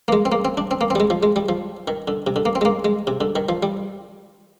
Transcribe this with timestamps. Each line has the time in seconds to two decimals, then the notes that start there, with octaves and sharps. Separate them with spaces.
0.08 A#3
0.13 G#3
0.25 C4
0.32 A#3
0.45 C4
0.57 D4
0.71 C4
0.81 A#3
0.90 C4
0.95 G3
1.00 G#3
1.10 F3
1.23 G#3
1.36 G3
1.49 F3
1.88 D#3
2.08 D3
2.27 C3
2.36 D3
2.45 A#3
2.55 C4
2.61 G#3
2.65 A#3
2.85 G#3
3.07 C3
3.21 D3
3.36 D#3
3.49 F3
3.63 G3